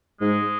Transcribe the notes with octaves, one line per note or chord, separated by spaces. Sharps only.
G#2 G#3